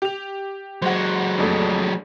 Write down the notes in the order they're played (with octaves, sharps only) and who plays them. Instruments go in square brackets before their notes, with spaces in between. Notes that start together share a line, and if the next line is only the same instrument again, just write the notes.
[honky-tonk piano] G4 F7
[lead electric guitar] F#3 G#3 [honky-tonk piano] C5 F#5
[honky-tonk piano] A#1 F2 A3